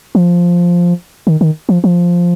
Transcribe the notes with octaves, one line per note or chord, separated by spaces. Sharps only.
F3
D#3
D#3
F3
F3